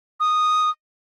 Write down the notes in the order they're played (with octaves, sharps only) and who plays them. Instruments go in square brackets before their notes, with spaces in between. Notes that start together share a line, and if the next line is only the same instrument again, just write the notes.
[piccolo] D#6